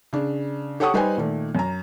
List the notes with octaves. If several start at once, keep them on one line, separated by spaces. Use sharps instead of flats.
C#3 D4
G4 A4 C#5 F#5 C#6 D#6
G3 D#4 B4 C5 G5 G#5
A#2 D#3 A3
F#2 A#5